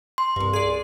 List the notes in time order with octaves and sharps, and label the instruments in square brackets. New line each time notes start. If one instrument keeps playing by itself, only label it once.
[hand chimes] C6
[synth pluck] C2 G2
G#4 D5